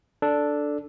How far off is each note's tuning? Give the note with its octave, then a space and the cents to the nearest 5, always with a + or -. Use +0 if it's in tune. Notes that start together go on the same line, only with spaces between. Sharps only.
D4 +0 A4 +0